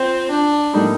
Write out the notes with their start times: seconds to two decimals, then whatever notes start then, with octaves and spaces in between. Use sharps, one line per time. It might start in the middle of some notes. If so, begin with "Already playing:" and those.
Already playing: C4 F4
0.30 D4
0.73 A2 G3 A#3 D#4